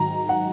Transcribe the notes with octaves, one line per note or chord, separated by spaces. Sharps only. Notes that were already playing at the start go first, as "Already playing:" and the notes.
Already playing: G#2 D#3 F#3 A#5
F#5